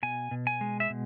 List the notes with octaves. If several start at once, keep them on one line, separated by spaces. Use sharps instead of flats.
B2 G#5
B2
G#5
G#3
E5
B2